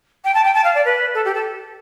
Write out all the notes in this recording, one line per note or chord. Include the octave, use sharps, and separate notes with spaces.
G5
A5
G5
A5
F5
D5
B4
A4
G4
A4